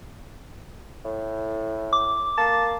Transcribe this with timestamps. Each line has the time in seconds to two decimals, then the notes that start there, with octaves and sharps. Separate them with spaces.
1.05 A2
1.93 D6
2.38 A#3 A5